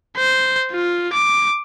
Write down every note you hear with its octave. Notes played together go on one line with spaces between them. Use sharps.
C5
F4
D6